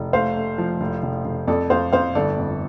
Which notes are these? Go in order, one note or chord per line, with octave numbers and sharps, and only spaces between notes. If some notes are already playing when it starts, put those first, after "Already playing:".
Already playing: F1
A3 C5 F5
A3
F3
F1
F1
F1
F2 A4 D5
F2 C5 F5
F2 C5 F5
G1 A4 D5
F2